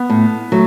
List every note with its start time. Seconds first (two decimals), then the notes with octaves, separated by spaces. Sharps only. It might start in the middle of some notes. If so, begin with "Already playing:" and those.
Already playing: B3
0.10 A2
0.52 F#3 A3